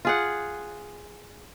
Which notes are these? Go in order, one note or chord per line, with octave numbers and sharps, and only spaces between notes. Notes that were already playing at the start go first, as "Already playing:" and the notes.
F4 G#4 F#5